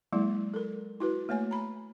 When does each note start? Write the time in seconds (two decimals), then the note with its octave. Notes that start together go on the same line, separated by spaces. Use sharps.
0.13 F#3 G#3 A#3 E4
0.54 A4 A#4
1.00 E4 F#4 B4
1.29 A3 A#3 C#5 G#5
1.51 A#5 B5